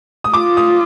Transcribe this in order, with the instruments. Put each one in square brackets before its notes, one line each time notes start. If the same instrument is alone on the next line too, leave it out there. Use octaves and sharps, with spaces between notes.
[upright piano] D#6
[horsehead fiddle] F4 [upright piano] D6
[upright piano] D#6